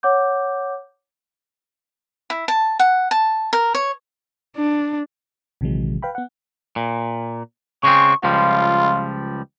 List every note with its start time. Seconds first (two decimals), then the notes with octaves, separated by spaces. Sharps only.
0.03 C#5 F#5 D6 G6
2.30 E4
2.48 A5
2.79 F#5
3.11 A5
3.53 A#4
3.75 C#5
4.57 D4
5.61 A#1 C3 D#3 E3 F#3 G#3
6.02 B4 F5 G5 B5
6.15 B3 F#5
6.76 A#2
7.83 C#3 G#3 C4 C#6
8.24 C#2 F3 G3 F4